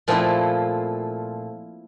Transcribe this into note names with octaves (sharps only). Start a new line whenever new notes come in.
A#2 F3 A3 C4 E4